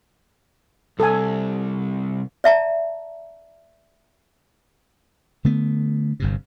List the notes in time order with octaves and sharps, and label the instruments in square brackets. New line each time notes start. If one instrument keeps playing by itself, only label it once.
[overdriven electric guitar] C2 [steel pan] A4 G#5
[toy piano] D5 E5 A5 A#5
[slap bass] D3 A3 B3
G1 G2 C3